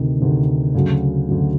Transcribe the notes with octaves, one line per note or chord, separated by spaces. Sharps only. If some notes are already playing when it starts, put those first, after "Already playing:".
Already playing: D2 C3 D#3
D2 C3 D#3
D2 C#3 F#3
D2 C#3 F#3